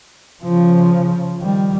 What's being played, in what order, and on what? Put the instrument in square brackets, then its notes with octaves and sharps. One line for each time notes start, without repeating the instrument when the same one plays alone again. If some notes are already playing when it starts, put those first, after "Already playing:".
[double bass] C#3 F3
D#3 G3